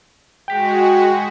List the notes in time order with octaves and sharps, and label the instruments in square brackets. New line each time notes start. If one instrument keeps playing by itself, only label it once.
[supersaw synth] G#3 F#4 [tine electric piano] G5 B6